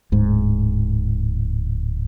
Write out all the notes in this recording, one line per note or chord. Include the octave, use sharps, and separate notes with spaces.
D1 G#2